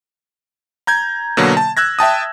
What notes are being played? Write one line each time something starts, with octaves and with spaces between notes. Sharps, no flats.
A#5 G6 G#6
B2 D3 F#3 A#3
A5
E6 F#6 G#6 A#6
E5 G5 A5 D#6